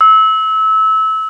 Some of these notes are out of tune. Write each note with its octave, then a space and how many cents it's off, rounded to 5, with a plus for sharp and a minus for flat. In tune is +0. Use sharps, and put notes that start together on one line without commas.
E6 -25